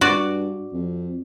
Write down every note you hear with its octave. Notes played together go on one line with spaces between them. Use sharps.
G2 F#4 D5
F2